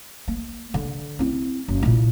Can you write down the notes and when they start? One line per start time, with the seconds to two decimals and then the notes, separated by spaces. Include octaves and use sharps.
0.28 A#3
0.74 D3
1.19 C4 E4
1.68 F#1
1.83 A#2 E4